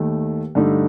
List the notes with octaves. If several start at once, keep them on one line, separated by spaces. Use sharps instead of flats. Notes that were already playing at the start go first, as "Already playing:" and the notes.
Already playing: D#2 D#3 A3
G2 D3 A3 D#4